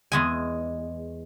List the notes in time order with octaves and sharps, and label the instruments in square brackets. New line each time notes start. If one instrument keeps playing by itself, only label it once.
[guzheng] E2 G#3 G#5